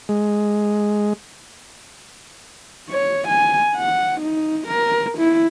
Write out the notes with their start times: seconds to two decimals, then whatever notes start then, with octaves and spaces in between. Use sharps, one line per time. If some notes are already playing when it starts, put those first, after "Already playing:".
0.09 G#3
2.90 C#5
3.28 G#5
3.76 F#5
4.21 D#4
4.68 A#4
5.18 E4